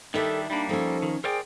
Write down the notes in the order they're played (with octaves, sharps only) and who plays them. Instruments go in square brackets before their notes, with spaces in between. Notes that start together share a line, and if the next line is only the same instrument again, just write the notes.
[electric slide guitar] D#3 G3 D4 [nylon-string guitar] D#4 E5 [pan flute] A4
[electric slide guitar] G3 A#3 [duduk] D4 [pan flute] B5
[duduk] F3 [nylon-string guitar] C#4 D#4 [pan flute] A4
[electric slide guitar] D#3
[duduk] G#4 [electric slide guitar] A#4 C5 D5 [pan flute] G5